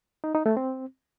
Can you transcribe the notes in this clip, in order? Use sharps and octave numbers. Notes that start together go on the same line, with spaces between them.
D#4
D#4
A3
C4